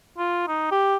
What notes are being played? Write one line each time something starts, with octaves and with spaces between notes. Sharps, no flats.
F4
D#4
G4